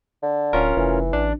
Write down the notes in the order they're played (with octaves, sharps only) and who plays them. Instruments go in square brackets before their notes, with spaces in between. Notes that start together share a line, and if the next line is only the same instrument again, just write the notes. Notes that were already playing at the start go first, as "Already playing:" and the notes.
[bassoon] D3
[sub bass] D1 [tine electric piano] C#4 F4 A#4
[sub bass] F1 [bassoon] E3
[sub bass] A1 [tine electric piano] D4